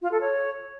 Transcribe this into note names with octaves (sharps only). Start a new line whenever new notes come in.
F4
A4
C#5